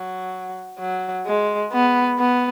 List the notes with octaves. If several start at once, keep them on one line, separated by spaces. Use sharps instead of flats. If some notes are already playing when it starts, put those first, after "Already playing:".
Already playing: F#3
F#3
G#3
B3
B3